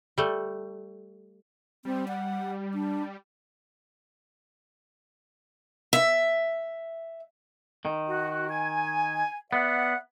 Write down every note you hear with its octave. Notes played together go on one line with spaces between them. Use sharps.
G3 A3
G3 C4
F#5
D4
E5
D#3
F#4
G#5
B3 D5 E5 F#5